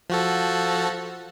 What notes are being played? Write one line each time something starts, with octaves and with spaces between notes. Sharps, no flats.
F3 F#4 A4